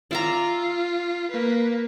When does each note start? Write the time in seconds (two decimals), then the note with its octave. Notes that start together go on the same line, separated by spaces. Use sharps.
0.11 F4 D5 E5 A#5
1.31 A#3 B4